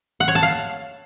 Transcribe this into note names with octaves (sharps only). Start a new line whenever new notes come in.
F#5
C#5
A5
F5